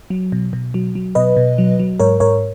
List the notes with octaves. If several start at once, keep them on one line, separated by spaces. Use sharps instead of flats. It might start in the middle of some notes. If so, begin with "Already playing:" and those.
F#3
B2
B2
F#3
F#3
B2 B4 D#5
B2
F#3
F#3
G#2 A#4 C#5
G#2 A#4 C#5